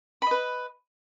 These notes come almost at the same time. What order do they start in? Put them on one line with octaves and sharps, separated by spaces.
B5 D#5 B4